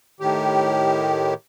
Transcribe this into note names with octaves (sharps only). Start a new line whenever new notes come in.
A2 D#3 G4